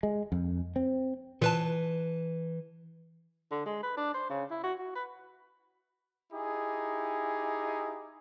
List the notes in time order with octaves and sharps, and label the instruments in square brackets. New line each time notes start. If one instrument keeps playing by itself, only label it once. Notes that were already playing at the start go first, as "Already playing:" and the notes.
[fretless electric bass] G#3
F2
C4
[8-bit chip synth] A#2 B4 A5 [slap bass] E3
[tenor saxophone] D3
G#3
B4
D4
C5
C#3
E4
F#4
F#4
B4
[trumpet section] D#4 E4 G4 G#4